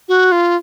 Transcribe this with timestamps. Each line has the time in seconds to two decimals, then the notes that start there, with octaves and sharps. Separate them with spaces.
0.08 F#4
0.32 F4